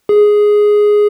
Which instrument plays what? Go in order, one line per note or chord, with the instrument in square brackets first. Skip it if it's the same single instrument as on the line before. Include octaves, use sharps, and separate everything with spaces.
[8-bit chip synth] G#4